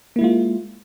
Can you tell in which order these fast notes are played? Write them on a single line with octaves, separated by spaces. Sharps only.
A#3 E4 G#3 F4